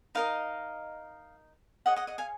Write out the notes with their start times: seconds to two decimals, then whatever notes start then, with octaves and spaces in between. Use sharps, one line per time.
0.15 D#4 A#4 D#5 F5
1.86 G#4 C#5 D#5 F#5
1.96 D#5 F#5
2.07 D#5 F#5
2.18 F5 G#5